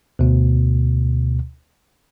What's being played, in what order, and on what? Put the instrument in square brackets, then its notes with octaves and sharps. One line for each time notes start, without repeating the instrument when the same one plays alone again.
[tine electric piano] D2 B2